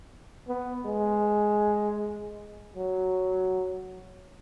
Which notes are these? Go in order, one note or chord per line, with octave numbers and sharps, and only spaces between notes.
B3
G#3
F#3